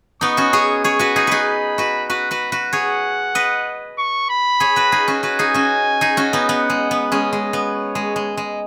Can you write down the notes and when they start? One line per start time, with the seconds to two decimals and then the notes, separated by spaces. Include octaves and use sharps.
0.21 B3 D#4 C#6
0.37 C#4 F#4
0.53 G#4 C#5
0.84 G#4 C#5 C#6
0.99 F#4 B4
1.16 D#4 G#4
1.27 D#4 G#4 B4
1.48 B5
1.78 F#4 B4
2.10 F#4 B4 B5
2.31 F#4 B4
2.52 F#4 B4
2.72 G#4 C#5 F#5
3.35 B4 D#5
3.98 C#6
4.30 B5
4.60 G#4 C#5
4.76 F#4 B4
4.92 D#4 G#4
5.08 C#4 F#4
5.23 F#4 B4 G#5
5.39 D#4 G#4
5.54 C#4 F#4
6.01 D#4 G#4
6.17 C#4 F#4
6.33 B3 D#4
6.48 B3 F#5
6.70 G#3
6.91 B3
7.11 G#3 C#4 D#5
7.33 G#3
7.53 B3
7.74 C#5
7.95 G#3
8.16 G#3
8.37 G#3